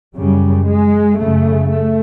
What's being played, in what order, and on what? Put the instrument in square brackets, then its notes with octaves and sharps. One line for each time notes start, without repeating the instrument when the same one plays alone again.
[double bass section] F#2 C#3 G3
G#3
F#2 C#3 A3
A3